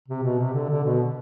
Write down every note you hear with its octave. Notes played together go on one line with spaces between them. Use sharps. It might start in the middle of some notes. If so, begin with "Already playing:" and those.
C3
B2
C3
D3
D3
B2